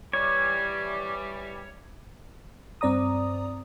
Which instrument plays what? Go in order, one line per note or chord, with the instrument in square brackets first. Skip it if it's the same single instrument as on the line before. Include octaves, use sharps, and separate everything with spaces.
[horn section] E3 G3 [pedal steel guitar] C#5
[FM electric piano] G2 C4 D5 A#5 D#6